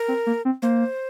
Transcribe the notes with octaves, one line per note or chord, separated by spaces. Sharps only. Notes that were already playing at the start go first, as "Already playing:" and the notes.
Already playing: A#4
C4
A#3
C4
A#3 C5